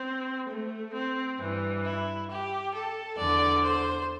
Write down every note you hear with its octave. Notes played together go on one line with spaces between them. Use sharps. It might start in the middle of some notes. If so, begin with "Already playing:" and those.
Already playing: C4
A3
C4
G2 E3
E4
G4
A4
E2 D3 D5
C5